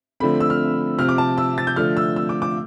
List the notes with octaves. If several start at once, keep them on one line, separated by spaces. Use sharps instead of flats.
D3 F3 A3 C4 B5
E6
F6
C3 F3 C4 F6
D6
A5
E6
A6
G6
D3 F3 A3 F6
E6
E6
D6
D6